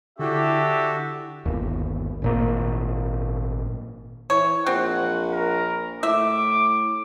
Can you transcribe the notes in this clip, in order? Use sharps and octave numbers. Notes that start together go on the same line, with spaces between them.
D3 D4 E4 F#4 G4 A4 E5
G1 D#2
G#1 A#2 A#3
E3 C#5
A#1 C4 F#5
A#4
A2 E5 D6